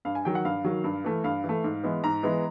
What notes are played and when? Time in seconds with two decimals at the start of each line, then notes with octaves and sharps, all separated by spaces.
0.05 G2 F5
0.15 G#5
0.25 D#3 F#3 G5
0.35 F#5
0.45 G2 F5
0.65 D#3 F#3
0.84 G2
1.04 E3 A3
1.24 G2 F5
1.44 E3
1.49 A3
1.64 G#2
1.84 E3 G#3 B3
2.04 G#2 A#5
2.23 E3 G#3 B3